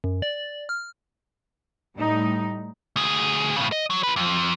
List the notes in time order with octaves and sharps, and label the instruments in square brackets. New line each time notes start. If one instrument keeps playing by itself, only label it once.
[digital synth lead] F#2
D5
F6
[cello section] A2 G3 D#4
[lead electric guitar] D2 G#4
A2 C#3
D#5
F#3
F4 B4
F2